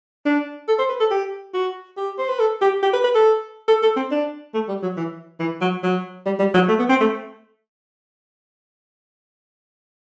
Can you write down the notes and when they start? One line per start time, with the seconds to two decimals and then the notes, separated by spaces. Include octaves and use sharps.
0.25 D4
0.68 A4
0.79 C5
0.89 B4
1.00 A4
1.11 G4
1.54 F#4
1.97 G4
2.18 C5
2.29 B4
2.39 A4
2.61 G4
2.82 G4
2.93 B4
3.04 B4
3.15 A4
3.68 A4
3.82 A4
3.96 C4
4.11 D4
4.54 A3
4.68 G3
4.82 F#3
4.97 E3
5.40 E3
5.61 F#3
5.83 F#3
6.26 G3
6.39 G3
6.54 F#3
6.68 A3
6.79 B3
6.89 C4
7.00 A3